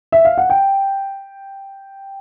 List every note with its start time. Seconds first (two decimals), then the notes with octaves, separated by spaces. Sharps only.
0.12 E5
0.25 F5
0.38 F#5
0.50 G5